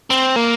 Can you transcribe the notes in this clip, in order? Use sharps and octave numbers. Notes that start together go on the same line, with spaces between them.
C4
A#3